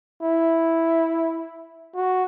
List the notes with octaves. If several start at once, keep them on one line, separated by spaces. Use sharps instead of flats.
E4
F#4